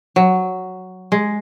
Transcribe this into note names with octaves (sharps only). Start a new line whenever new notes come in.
F#3
G#3